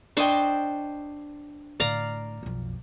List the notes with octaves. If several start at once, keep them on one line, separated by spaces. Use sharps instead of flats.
D4 C5 D#5 G5 C#6 D6
A2 D3 D5 F5 A#5
B1 F2